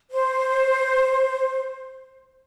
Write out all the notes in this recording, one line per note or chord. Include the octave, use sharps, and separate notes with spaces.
C5